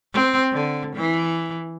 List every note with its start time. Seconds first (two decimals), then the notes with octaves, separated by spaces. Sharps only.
0.13 C4
0.52 D3
0.95 E3